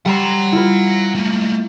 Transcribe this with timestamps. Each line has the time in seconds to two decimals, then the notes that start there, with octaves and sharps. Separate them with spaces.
0.06 G3 F#5 A#5 C6
0.52 E4 F4 B4
0.87 A#6
1.15 A3 A#3